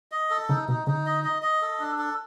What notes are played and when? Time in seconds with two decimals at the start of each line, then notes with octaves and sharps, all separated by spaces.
0.12 D#5
0.30 A4
0.49 D3 D#4
0.68 C3 D#4
0.87 D3 D#4
1.06 D#5
1.24 D#5
1.42 D#5
1.62 A4
1.80 D4
1.98 A4